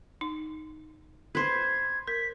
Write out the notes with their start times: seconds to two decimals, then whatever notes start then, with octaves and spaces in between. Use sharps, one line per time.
0.21 D#4
1.35 B4 C5 G#6
2.08 A#4 B6